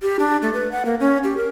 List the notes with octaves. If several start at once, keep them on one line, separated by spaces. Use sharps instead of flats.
G4
D4
A3
B4
F#5
A#3
C#4
G4
A#4